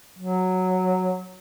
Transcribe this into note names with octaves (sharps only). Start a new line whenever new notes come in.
F#3